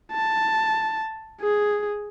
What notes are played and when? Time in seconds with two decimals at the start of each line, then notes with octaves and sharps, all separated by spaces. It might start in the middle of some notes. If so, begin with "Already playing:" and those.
0.12 A5
1.41 G#4